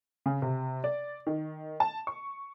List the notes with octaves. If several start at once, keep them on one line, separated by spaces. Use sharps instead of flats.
C#3
C3
D5
D#3
A5
C#6